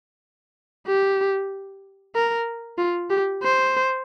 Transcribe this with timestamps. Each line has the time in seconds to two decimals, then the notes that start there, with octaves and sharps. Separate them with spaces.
0.87 G4
2.15 A#4
2.78 F4
3.10 G4
3.43 C5